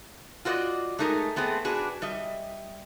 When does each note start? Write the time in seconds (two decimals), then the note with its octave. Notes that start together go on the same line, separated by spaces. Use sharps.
0.45 F4 F#4 C5 D5 D#5
0.99 G#3 A3 D#4 G#4 A#4
1.36 A3 B3 C4 G#4
1.65 D4 F#4 G#4 B4
2.02 G3 D#5 E5